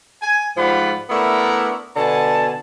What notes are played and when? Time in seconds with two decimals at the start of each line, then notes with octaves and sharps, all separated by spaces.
0.22 G#5
0.57 G#2 F3 G3 F4 F#5 B5
1.10 A3 B3 D4 E4 A#4 D5
1.96 B2 D3 G#5 A5